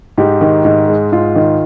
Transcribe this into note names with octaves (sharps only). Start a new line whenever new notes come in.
G#2 G4
D#3
G#2
G#3
G#2 F4
D#3